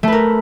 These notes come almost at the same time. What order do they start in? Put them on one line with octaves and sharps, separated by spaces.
A3 B4 A#4